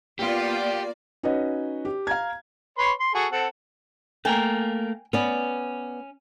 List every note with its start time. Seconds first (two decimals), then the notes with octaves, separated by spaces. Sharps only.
0.19 A#3 B3 F4 G4 D5
1.23 C#4 D#4 F#4 B4 C#5 D#5
1.85 G4
2.07 F5 A#5 G#6
2.78 B4 C#5 C6
3.00 C6
3.15 F#4 G#4 A4
3.32 C4 A4 F#5
4.25 A3 A#3 A#4 G5 G#5
5.13 B3 C#4 D5